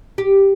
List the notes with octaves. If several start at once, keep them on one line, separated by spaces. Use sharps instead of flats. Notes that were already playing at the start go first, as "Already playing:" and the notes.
G4